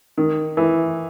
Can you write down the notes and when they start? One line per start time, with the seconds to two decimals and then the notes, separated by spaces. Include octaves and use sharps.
0.17 D#3
0.57 E3